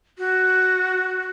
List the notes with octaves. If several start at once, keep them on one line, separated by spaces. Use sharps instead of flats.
F#4